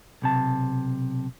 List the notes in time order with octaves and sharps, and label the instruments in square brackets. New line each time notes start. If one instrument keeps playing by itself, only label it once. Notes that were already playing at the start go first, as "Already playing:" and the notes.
[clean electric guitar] B1 C3 A5